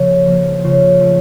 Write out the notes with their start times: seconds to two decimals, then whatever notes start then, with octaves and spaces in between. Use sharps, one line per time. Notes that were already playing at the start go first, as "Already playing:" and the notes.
Already playing: C#3 F3 A#3
0.26 F3 A#3
0.64 C#3 F4
1.01 F3 A3